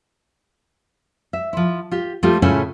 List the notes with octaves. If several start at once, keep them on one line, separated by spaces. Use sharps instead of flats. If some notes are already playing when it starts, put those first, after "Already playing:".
E5
F3 E4
F4 G4
F3 G3 A3 C4 F4 G4
A2 C#3 C#4 E4 F4 G#5